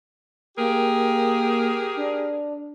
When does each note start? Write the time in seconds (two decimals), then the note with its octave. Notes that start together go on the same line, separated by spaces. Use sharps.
0.57 A#3 G4 G#4 A#4
1.96 D4